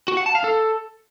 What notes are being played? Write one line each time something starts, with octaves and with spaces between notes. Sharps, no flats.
F#4
F#5
A5
F5
A4